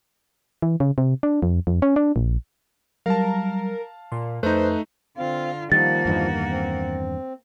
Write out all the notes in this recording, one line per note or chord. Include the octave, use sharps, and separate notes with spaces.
E3
C#3
C3
D4
F2
F2
C#4
D4
A#1
F#3 G3 A#4 F5 A5
A#2 C6
F2 A3 D#4 B4 C5 F#6
D3 C4 F4 F5
D#3 F3 G3 A#3 F#5 A6
E2 G2 D#3
C4